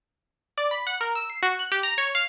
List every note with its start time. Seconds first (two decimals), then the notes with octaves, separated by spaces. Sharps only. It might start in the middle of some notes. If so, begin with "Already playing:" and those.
0.58 D5
0.71 B5
0.87 F#5
1.01 A#4
1.15 E6
1.30 C7
1.43 F#4
1.59 F#6
1.72 G4
1.83 A#5
1.98 C#5
2.15 F5